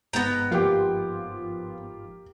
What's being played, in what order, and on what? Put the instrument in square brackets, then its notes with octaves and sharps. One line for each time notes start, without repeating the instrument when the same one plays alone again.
[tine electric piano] G1 G#2 G#3 [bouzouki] B3 G5 [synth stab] A#5
[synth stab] F3 F4 [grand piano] A#3 G4